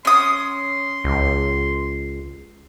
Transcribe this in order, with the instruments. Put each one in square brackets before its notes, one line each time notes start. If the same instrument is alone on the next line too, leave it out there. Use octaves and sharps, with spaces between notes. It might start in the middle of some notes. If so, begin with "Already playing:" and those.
[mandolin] C#4 D#6 [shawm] C6
[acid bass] C#2